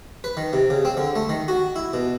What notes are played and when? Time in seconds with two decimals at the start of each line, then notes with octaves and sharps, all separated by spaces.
0.24 B4
0.37 D#3
0.53 C3
0.70 C#3
0.85 C4
0.97 D3
1.16 A3
1.29 D#3
1.48 F#4
1.76 E4
1.93 B2